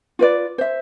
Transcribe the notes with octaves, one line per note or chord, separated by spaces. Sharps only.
F4 B4 D5
C5 E5